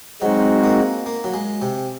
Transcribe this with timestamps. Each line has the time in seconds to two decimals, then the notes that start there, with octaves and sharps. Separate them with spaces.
0.22 F#3 G#3 C4 D#4 F#4
0.64 A#3
1.06 A#3
1.24 F#3
1.34 G#3
1.62 C3